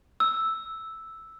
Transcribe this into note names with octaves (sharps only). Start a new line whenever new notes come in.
E6